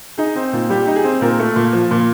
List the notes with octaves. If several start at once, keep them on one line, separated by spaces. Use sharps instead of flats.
D#4 G#4
C4
A#2
G3 G4
D#4
G#4
C4
A#2 A#4
A3
A#2
F3
A#2